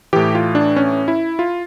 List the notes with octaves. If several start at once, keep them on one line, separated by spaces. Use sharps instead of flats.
A2 E3 G4
F4
D4
C#4
E4
F4